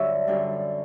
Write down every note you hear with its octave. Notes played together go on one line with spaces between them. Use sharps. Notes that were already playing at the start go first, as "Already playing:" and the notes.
Already playing: G2 D3 F#3 C#5 E5
F#2 D3 G3